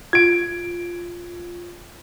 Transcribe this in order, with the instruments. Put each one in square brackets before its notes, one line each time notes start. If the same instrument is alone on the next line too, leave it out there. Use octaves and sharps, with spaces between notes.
[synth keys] F4 [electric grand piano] G#6 D7